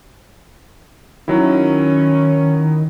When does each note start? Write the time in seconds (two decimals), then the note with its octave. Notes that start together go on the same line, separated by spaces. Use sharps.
1.28 D#3 F#3 C#4 E4